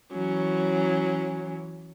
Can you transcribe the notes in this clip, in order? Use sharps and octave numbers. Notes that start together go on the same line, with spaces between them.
E3 F#3 C#4